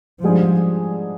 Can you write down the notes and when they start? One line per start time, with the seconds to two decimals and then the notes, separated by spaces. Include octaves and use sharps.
0.24 G#2 F3 G3 D4 G#4